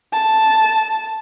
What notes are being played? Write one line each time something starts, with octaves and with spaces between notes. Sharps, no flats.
A5